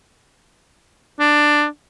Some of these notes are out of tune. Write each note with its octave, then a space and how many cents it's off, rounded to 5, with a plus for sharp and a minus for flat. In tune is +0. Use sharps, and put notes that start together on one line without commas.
D4 +10